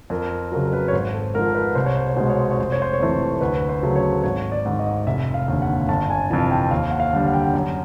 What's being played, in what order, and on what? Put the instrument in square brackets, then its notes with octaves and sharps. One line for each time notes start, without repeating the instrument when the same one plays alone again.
[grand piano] F2 A#4
C#3 F#3 A#4
A#4
B4
C#5
G#1 C5
A4
G#2 F3 A#4
B4
C2 C5
C#5
C5
C#5
B2 G#3 C5
C#5
C5
C#5
F1 C5
C#5
C5
C#5
F2 C3 E3 A3 C5
D2 B4
C5
C#3 F#3 A3
C#5
G#1 C#5
D5
G#2 D#3
D#5
F1 E5
F5
D#2 D3
F#5
G1 A5
G#5
F2 C3 E3 A5
G5
D#2 F5
F#5
F5
D3 G3
F#5
G5
F#5
F#2 F#5